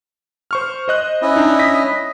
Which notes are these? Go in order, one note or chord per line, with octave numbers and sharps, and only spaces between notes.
C5 C#6 F6
C5 D#5 F#6
C#4 E4 D#5
D4 D#4
D#6 A#6 B6